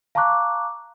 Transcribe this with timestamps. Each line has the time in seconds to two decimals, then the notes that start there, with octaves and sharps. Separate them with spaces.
0.15 F5 A5 A#5 C#6 D6 F#6